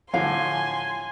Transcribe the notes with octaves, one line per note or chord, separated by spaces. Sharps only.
A2 D3 F3 F5 G#5 C6